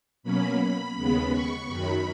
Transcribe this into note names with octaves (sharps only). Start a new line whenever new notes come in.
B2 F#3 A#3 C#4 B5
B5
D#2 C#3 G#3 B3 B5
C#6
F#2 D#3 F#3 B5